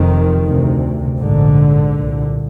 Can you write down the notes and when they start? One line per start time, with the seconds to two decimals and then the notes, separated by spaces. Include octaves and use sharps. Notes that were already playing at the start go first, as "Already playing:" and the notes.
Already playing: F1 F2 C3 D#3
0.46 D2 C3
1.19 A#1 G#2 D3
1.93 C2 A#2